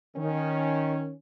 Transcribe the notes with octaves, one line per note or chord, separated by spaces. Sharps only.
D#3 C#4